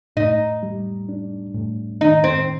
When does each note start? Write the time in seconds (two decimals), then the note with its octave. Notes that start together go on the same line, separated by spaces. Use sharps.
0.17 A2 D#4
0.63 G3
1.09 D4
1.55 A2
2.01 D#3 D#4
2.24 C4